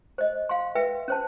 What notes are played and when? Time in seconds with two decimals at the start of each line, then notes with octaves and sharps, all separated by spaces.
0.18 C5 D#5
0.49 F5 C6
0.75 B4 E5 G5
1.08 C#4 C5 A5